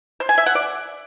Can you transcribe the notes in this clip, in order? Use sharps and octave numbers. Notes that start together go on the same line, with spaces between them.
C5
G#5
E5
F#5
D5